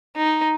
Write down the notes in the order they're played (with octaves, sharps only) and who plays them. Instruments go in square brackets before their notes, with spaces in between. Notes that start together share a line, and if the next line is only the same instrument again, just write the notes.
[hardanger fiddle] D#4